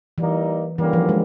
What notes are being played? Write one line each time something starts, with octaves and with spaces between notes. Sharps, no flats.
E3 G3 A#3 D#4
G2 D3 E3 G3 A#3 C#4
F3
G#3